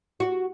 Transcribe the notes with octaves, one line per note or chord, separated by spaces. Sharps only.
F#4